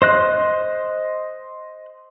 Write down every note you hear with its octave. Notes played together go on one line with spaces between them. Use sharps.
C5 D#5 F#6